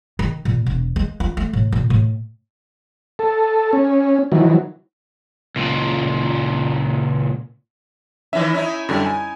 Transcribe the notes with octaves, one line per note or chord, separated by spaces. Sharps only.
D#3
A#2
E1
G#3
F4
A3
A2
A#2
A2
A4
C#4
D#3 E3 F#3
C#2 A#2
D#3 E3 C#4 E5
C#4 D#4 E4
F#2 D3 G3
G#5